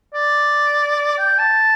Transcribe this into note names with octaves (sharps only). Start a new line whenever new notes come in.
D5
G5
A5